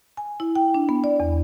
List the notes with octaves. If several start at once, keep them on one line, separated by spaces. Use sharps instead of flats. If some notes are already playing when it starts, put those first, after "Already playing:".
G#5
E4
G5
D4
B3
D5
E2